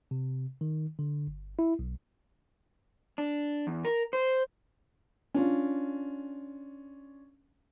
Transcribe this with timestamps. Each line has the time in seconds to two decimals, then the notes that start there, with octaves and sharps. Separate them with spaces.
0.11 C3
0.61 D#3
0.99 D3
1.27 G1
1.59 E4
1.79 B1
3.18 D4
3.67 E2
3.85 A#4
4.13 C5
5.34 C#4 D4 F4